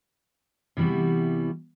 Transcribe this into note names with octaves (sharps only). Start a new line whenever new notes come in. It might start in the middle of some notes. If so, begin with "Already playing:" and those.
C3 E3 G3 B3 F#4